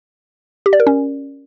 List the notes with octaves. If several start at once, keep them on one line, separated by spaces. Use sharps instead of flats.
G4
D5
A#4
C#4